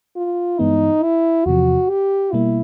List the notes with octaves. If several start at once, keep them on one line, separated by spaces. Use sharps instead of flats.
F4
G2 E3 G#3 B3 D#4
E4
E2 C3 F3 F#4
G4
B2 G3 A#3 E4